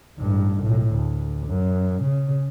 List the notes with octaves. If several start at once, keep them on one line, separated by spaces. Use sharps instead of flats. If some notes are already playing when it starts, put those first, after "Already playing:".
A1 G2
B1 A2
D2
F#2
C#3